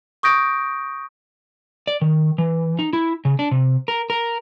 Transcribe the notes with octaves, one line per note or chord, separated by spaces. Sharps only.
C#6 D#6 G6 A#6 D7
D5
D#3
E3
D#4
E4
C#3
D4
C3
A#4
A#4